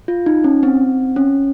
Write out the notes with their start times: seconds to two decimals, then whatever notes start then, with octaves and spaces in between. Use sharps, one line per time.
0.08 F4
0.26 D#4
0.44 C#4
0.63 C4
1.16 C#4